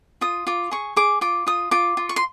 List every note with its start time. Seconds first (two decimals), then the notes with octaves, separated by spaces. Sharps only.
0.21 F4 D#6
0.47 F4 D6
0.71 G#4 C#6
0.96 G#4 D6
1.21 F4 D6
1.47 F4 D#6
1.71 F4 D6
1.97 F4
2.09 C#6
2.16 C6